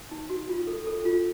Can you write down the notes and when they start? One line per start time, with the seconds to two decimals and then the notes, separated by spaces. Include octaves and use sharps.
0.11 D#4
0.30 F#4
0.49 F4
0.67 A4
0.87 A4
1.05 F4